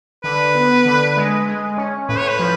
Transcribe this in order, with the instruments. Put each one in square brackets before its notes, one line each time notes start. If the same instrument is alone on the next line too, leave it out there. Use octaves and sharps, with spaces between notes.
[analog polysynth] D3 [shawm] B4
[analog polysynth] B3
D3
G#3
G#3
C#4
[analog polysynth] A2 [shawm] B4
[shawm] C#5
B4
[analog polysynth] F3